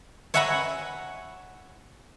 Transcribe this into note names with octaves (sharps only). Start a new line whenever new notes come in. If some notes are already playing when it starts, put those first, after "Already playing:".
C#5 E5 F#5 G#5 A#5 B5